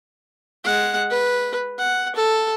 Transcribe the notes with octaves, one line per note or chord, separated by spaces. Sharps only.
G#3 F#5
B4
F#5
A4